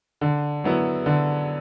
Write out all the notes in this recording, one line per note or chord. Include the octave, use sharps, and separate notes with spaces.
D3
F#3 B3 E4
D3